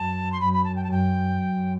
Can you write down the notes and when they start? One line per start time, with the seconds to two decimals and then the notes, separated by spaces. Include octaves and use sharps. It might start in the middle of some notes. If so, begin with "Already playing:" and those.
Already playing: F#2 A5
0.32 C6
0.40 F#2 B5
0.53 B5
0.64 A5
0.76 G5
0.84 A5
0.88 F#2 G5
1.35 F#2